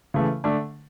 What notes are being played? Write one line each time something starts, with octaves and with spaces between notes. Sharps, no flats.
C#3 E3 A3
D3 A3 D4